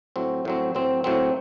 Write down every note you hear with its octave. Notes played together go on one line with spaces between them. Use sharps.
A2 F#3 C4
A2 F#3 C4
A2 F#3 C4
A2 F#3 C4